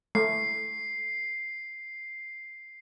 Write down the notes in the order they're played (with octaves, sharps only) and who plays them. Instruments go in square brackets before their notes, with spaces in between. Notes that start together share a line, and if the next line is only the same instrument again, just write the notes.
[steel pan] A3 [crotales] C7